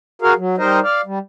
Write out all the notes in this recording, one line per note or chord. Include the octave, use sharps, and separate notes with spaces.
F#4 G#4 A#4 F5
F#3
G3 D#4 A#4 C5 D#5
D5 F5
G3